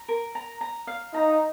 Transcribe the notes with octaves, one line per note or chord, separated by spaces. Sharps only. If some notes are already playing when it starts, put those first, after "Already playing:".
Already playing: A#5
A#4
A#5
A#5
F5
D#4 A#5